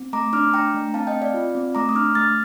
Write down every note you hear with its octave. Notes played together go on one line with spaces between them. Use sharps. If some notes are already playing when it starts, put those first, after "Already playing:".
Already playing: C4
A3 A#5 D6
D4 D6 F6
D4 G5 A#5
A3
C4 F5 A5
D#5 G5
C4
D5 F5
F4
C4
A3 A#5 D6
D#6
D4 D6 F6
A3 F6 A6